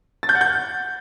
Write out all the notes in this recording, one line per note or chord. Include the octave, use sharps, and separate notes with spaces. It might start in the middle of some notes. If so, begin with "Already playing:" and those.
A6
G6
F#5
G6